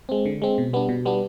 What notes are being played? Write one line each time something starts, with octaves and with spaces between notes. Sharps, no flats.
G#3 C4
D3
G#3 C4
B2
G3 B3 D4
B2
G3 B3 D4